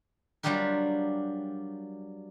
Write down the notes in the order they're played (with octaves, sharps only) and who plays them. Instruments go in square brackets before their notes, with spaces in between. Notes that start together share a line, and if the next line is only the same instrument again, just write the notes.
[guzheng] F#3 G3 D4 F4 G4 A#4